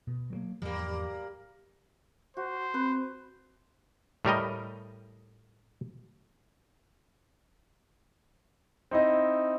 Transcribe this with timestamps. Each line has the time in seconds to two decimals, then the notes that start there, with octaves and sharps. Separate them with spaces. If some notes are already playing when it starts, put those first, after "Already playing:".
0.07 B2
0.30 F#3 G3 A#3
0.62 E2 G#2 F3 G3 A#3
2.37 F#4 C5
2.74 C4 B4
4.25 A2 G3 A#4 D#5
8.91 C4 D#4 E4 D#5